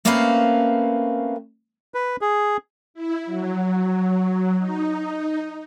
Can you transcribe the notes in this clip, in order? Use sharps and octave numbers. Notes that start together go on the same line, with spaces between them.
A3 A#3 C4 C#4 B4 F5
B4
G#4
E4
F#3
D#4